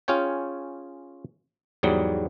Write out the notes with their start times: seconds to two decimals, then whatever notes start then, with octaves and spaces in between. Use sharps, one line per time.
0.08 C#4 F4 G#4 C#5 G5
1.83 E2 G#2 F#3 G3